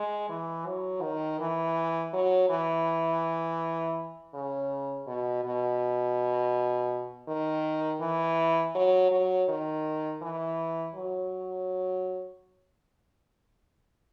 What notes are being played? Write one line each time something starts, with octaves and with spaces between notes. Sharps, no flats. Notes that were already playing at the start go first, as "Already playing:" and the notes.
Already playing: G#3
E3
F#3
D#3
E3
F#3
E3
C#3
B2
B2
D#3
E3
F#3
F#3
D#3
E3
F#3